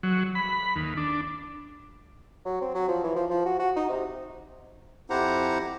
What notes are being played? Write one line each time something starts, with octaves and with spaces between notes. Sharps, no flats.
F#3
B5
D#2
D4
F#3
C4
F#3
F3
E3
F3
F3
F#4
F#4
D#4
C3
F2 E4 G4 C5 F#5 A#5